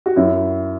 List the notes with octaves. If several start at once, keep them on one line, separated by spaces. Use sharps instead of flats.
F#4
F#2 E4